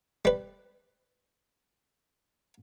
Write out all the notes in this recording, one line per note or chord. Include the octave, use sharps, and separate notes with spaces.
G3 B4